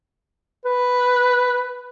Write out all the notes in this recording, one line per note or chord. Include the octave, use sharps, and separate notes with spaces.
B4